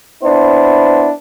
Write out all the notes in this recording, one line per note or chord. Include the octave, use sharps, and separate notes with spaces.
B3 D4 E4 C5